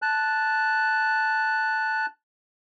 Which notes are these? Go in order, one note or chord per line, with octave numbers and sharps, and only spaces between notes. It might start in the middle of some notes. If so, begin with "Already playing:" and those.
A5 F#6